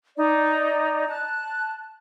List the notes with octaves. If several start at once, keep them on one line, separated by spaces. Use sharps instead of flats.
D#4 D5
A5 F#6